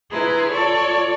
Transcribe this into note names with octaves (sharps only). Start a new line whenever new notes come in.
E4 G#4 B4 A#5 C6
F4 A4 C#5 D5